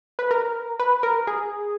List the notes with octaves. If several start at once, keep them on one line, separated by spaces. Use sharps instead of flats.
B4
A#4
B4
A#4
G#4